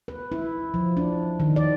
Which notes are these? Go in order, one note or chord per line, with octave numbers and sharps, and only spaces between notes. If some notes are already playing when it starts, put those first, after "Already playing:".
B4
E4
F3
D4
D#3
D5